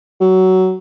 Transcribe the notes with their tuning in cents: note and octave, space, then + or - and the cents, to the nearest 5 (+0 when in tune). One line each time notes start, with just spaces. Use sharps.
F#3 +15